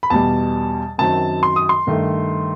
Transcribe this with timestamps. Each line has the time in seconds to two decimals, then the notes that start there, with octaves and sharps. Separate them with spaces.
0.03 B5
0.10 E2 B2 G3 A5
0.98 F#2 D#3 F#3 C4 A5
1.43 C6
1.56 D#6
1.69 C6
1.87 G2 D#3 A3